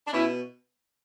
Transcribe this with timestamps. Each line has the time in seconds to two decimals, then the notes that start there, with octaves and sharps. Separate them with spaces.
0.07 D4
0.12 B2 C#4 E4